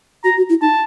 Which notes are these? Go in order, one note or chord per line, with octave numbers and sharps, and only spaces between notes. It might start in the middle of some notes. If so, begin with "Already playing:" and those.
F#4 A#5
F#4
E4
D#4 A5